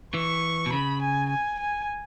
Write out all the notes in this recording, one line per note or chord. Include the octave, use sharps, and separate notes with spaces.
E3 C#6
B2
C#3 B5
G#5
G#5
G#5